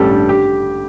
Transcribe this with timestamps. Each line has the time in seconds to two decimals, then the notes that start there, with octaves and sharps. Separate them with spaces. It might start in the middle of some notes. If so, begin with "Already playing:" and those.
Already playing: A1 G2 G3 G4 A4
0.11 D3
0.29 G4